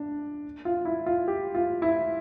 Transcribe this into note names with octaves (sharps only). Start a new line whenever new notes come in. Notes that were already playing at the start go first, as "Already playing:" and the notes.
Already playing: D4
F4
E4
F4
G4
F4
E4